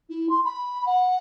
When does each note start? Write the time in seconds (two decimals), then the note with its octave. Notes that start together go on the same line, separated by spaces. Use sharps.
0.10 E4
0.30 C6
0.45 B5
0.86 F#5